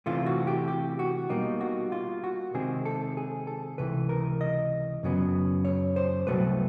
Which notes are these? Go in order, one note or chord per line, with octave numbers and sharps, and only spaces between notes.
C3 E3 A3 F4
F#4
G4
G4
F#4
B2 G3 A#3 D#4
F#4
F4
F#4
C3 D#3 G#3 C4 G#4
A4
G#4
A4
C#2 C3 E3 B4
A#4
D#5
F#2 C#3 F#3 B3
C#5
C5
C2 B2 F#3 A3 B4